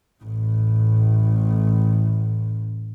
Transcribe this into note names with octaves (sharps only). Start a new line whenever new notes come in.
A1 A2